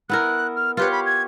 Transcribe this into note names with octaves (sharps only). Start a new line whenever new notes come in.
B3 E4 A#4 F#6
F6
F4 G4 B4 C#5
B5
G#6